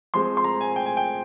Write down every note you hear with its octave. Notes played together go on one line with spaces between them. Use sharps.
F3 G#3 C4 C6
C6
A#5
G#5
G5
G#5
G5